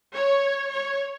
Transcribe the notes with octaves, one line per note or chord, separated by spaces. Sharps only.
C#5
C#5